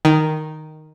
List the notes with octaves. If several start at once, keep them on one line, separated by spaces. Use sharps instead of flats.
D#3